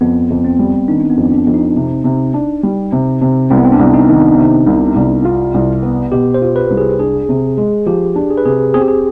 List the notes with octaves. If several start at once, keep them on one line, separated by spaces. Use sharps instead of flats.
F2 B3
F2
C4
G3
D#3 D4
B3
F2
D4
F2
D#4
C3
C3
D4
G3
C3
C3
C2 C4
B3
C4
D4
C2
D#4
D#3
C3
C2
C2
F4
C2
B3
B2 G4
C5
F4
B4
C2
G#4
D4 G#4
C3
G#3
F3 G4
D4
G#4
B4
C3 G#4
C4 G#4
G4
G#4